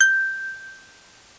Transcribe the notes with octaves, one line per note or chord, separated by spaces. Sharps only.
G6